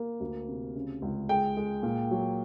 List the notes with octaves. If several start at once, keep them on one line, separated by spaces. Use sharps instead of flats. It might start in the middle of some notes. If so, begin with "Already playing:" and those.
Already playing: A#3
D2
C3
C#3
C#2
G#3 G5
G#3
A#2
F#3